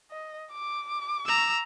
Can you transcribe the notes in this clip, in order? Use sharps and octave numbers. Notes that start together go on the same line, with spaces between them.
D#5
D6
A#5 E6